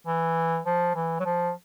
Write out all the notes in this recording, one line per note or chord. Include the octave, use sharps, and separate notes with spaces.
E3
F3
E3
F#3
F3